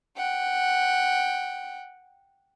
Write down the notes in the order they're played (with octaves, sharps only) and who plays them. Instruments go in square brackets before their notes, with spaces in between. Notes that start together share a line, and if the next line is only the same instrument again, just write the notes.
[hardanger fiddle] F#5 G5